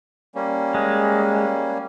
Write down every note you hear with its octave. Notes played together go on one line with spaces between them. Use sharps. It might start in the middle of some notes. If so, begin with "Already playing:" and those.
G3 A#3 C#4
G#3